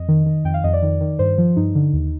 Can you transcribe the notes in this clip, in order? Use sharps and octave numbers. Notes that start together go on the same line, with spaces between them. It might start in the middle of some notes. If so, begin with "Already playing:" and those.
Already playing: F2 D#5
D#3
D#3
F2 G5
F5
F2 D#5
D5
D#3
D#3
G2 C5
F3
G2 D#4
D3
D#2